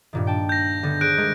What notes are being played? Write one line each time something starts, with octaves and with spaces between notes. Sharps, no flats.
G2 A#2 D#3
G5 A5
G6 A#6
D3 B3 A4
G#4 C5 F#6 D7
G3 G#3 A#4